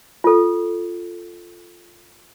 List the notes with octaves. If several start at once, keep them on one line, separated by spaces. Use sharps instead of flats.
F4 A4